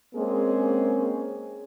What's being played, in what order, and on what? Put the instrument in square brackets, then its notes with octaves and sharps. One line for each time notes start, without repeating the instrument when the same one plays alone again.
[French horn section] G#3 A#3 C4 C#4 G#4